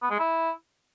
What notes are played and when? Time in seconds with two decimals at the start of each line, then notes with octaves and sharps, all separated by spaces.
0.02 B3
0.11 G#3
0.19 E4